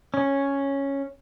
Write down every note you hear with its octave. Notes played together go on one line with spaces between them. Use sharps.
C#4